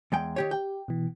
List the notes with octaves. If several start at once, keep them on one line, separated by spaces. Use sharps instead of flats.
E2 G#3 G5
D#3 G4 C#5
G4 G5
B2 E3